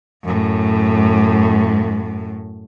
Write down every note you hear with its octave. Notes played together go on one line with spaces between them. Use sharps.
F#2 A2